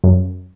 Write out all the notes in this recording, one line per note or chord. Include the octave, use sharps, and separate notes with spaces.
F#2